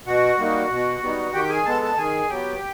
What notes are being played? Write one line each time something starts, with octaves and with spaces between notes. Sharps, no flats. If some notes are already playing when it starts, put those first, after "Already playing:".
B2 F#4 F#5
G3 A#3 D#4
B2
G3 B3 D#4
D#3 G4 G5
G#4 G#5
G#3 B3 A4 A5
A4 A5
D#3 G#4 G#5
F#3 B3 G4 G5